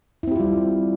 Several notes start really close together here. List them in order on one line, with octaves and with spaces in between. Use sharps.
E4 C4 G4 F4 G3